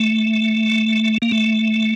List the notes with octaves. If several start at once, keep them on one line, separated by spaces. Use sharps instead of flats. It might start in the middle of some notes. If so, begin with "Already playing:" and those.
Already playing: A3
A#3
A3